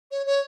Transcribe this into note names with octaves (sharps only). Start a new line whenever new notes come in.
C#5
C#5